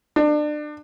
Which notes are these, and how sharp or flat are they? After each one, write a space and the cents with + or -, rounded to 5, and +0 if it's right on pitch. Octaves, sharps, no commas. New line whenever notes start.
D4 +30